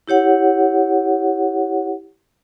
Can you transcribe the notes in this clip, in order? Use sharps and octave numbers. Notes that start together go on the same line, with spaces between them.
E4 G4 C#5 F#5